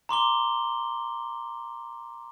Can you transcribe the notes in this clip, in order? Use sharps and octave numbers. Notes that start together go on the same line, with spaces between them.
A#5 C6 D6 G7